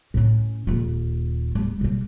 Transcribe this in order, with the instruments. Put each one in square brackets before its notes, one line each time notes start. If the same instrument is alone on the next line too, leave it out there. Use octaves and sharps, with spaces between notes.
[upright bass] A2 C#4
D#1 F4
G3 B3
B2 G3